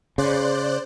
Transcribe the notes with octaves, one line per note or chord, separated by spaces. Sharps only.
C#3 C5 D5 F#6